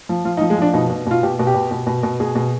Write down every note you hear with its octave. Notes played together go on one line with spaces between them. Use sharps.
F3
F3 F4
D#4
F3
G#3
F3 D4
B2 D#4
B2
B2 F4
B2 G4
B2
G4
B2
B2
B2
B2
B2 G#4
B2